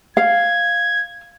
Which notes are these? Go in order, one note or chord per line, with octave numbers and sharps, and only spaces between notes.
F5 G#6